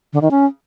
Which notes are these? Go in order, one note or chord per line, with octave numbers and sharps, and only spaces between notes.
D3
D#3
C#4